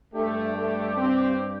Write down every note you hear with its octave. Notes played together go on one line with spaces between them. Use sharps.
G2 G3 A3 D4 G4
A3
C4